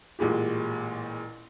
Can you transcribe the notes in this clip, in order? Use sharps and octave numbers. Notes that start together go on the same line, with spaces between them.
A1 A#2 G#3 G4